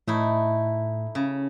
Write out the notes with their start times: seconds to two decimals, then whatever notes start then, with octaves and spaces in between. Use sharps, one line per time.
0.08 A2 A3 D#4 E4
1.15 C#3